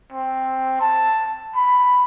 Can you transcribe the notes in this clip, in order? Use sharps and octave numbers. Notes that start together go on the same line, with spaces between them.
C4
A5
B5